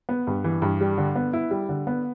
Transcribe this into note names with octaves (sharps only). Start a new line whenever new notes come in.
B3
G2
E3
G2
G3
D3
B3
E4
G3
D3
B3